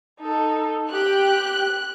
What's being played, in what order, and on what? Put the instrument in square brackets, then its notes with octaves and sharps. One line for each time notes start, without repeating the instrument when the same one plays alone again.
[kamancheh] D#4 A4
[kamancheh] G4 G5 [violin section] F#6